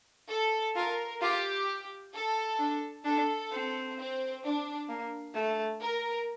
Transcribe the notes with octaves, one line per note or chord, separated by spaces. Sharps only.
A4
F4 A#4
F4 G4
A4
D4
D4 A4
C4
C4
D4
A#3
A3
A#4